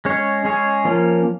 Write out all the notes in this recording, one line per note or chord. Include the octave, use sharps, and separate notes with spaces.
G#3 C#4 G#4 C#5
G#3 C#4 G#4 C#5
F3 A#3 C#4